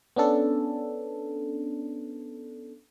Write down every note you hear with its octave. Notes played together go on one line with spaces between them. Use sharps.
B3 C#4 D4 A4